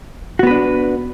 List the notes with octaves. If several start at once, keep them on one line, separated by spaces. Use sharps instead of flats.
B3 D4 F#4 B4